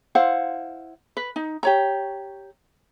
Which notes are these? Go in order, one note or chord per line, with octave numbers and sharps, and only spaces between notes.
E4 C5 F5 F#5
B4
D#4
G4 C#5 A#5